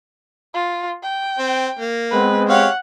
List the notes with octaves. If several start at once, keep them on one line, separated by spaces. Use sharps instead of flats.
F4
G5
C4
A#3
G#3 B3 C4 B4
G4 C#5 F5 F#5